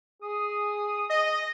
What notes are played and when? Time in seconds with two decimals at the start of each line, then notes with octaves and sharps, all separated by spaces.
0.22 G#4 D#6
1.10 D#5 A#6